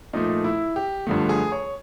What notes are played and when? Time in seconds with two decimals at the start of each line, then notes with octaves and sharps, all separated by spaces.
0.13 A#2 F3 A3 D#4
0.44 E4
0.76 G4
1.07 G2 D3 F3 A3
1.29 G#4
1.52 C#5